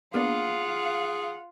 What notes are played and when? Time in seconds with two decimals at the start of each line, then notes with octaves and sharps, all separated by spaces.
0.14 A#3 B3 D4 F4 G#4 F5 F#5